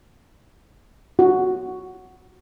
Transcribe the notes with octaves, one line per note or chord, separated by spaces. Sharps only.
F#4